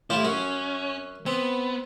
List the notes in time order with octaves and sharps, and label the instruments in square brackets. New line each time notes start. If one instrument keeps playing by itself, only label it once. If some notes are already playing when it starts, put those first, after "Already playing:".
[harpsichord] A2 F4 G4 [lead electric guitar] E4
[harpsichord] F#2 F#4 [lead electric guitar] C#4
[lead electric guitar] B3 [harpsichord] C4